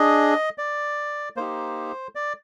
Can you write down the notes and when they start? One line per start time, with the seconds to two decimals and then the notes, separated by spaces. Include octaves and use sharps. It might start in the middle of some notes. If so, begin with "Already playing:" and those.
Already playing: D4 G#4 D#5
0.58 D5
1.37 A#3 D#4 G4 C5
2.15 D5